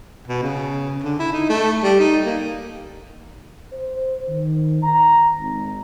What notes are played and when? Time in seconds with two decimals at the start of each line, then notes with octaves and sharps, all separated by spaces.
0.28 B2
0.42 C#3
1.04 D3
1.19 E4
1.33 D#4
1.49 A3
1.83 G3
1.99 D#4
2.25 A#3
3.72 C5
4.29 D#3
4.83 A#5
5.39 G#1